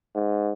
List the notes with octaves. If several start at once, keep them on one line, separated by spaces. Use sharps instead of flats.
G#2